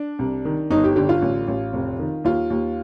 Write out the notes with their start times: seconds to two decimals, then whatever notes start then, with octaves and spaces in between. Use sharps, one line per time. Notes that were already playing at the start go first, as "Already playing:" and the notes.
Already playing: D4
0.19 C2
0.45 D#3
0.70 G1 D#4
0.84 G4
0.96 D3 G4
1.09 F4
1.22 A1
1.48 A1
1.73 F1
1.99 D#3
2.24 D#2 F4
2.50 D#2